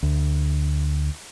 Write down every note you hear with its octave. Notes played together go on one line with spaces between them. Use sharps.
D2